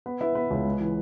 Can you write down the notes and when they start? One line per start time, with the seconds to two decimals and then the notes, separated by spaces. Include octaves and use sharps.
0.06 B3 B4
0.21 E4 B4 E5
0.35 B3 B4
0.50 C#2
0.65 G#3
0.80 E3